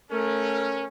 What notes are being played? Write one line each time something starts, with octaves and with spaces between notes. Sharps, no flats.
A3 C#4 A#4